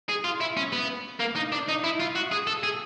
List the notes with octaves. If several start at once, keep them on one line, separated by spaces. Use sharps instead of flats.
G#4
F4
E4
C#4
B3
A#3
D#4
D4
D#4
E4
F4
F#4
G#4
A4
G#4